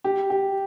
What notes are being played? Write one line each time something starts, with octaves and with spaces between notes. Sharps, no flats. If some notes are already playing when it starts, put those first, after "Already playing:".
G4
G4